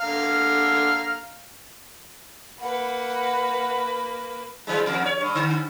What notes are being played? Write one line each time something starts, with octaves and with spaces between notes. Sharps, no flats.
D3 F5 A#5
A#3 B4 F#5 B5
E3 G3 G#3
E2
C#5
G2
D3